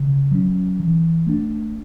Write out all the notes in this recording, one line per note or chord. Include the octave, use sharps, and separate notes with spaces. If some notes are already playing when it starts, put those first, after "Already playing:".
Already playing: C#3
F#3 C#4
E3
A3 D4